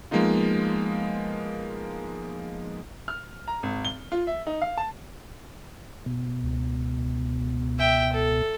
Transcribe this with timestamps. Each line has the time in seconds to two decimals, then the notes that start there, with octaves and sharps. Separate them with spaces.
0.11 F3 G#3 A#3 B3 D#4 F4
3.08 F6
3.48 A#5
3.63 G#1
3.85 G7
4.12 F4
4.27 E5
4.47 D#4
4.62 F5
4.77 A5
6.06 B2
6.44 C#2
7.79 E5 G5
8.12 A4